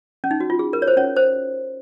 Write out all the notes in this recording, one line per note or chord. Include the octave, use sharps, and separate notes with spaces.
C#4
D#4
F#4
F4
G#4
A#4
C#5
C5
C#4 C#5
C5